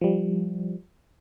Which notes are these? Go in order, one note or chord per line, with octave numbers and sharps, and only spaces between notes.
F3 G3